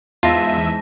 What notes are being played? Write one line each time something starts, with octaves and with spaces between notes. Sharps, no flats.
E2 G#2 D#4 F4 E5 A5 A#6 D#7